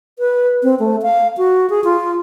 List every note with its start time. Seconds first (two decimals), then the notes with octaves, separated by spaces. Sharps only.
0.19 B4
0.63 C4
0.80 A3
1.02 F5
1.38 F#4
1.70 G#4
1.84 F4